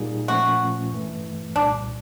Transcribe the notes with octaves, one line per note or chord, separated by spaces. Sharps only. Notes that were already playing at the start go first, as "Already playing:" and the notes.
Already playing: A#2 G3 A#3 D#4 G#4
A#2 F3 A3 C#4 F#4
G2 E3 A3
C2 A#2 G3 D4